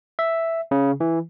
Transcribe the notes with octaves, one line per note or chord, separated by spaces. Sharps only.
E5
C#3
E3